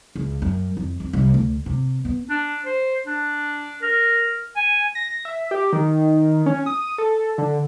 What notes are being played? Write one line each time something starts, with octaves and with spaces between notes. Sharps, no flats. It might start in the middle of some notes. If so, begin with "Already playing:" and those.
C#2
F#2
F2
F2
C2
D2
C3
B3
D4
C5
D4
A#4
G#5
A#6
E5
G4
D#3
C#4
D#6
A4
D3